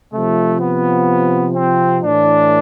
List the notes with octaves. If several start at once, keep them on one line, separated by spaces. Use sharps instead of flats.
C3 F3 A3
B3
C4
A2 E3 D4